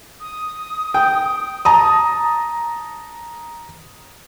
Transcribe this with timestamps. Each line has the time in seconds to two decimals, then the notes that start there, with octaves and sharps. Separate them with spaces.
0.21 D#6
0.94 G5
1.65 A5 A#5 D#6